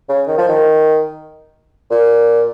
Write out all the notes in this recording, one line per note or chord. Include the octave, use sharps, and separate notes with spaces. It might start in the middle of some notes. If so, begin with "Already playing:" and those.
C#3
D#3
F3
D#3
A#2